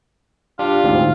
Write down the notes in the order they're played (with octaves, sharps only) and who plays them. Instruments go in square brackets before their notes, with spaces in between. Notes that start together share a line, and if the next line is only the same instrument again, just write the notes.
[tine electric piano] D4 G4 [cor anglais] F4
[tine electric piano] D2 G#2 C4